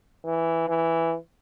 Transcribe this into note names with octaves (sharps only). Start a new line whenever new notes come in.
E3
E3